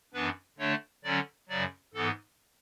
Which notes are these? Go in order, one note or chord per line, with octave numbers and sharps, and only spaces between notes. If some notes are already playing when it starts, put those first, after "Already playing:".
F#2 E3 B3 D4 B4
D3 A3 D4 C#5
D3 F#3 C#4 D5
F#2 C#3 F#3 D5
G#2 E3 B3 A4